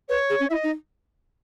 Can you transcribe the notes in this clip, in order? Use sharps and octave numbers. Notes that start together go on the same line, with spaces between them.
B4 C#5
G#4
C#4
E4 E5
D#5
D#4